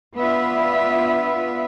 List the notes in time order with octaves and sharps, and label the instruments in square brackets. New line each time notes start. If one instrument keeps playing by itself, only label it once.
[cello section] B3 D4 F4 B4 E5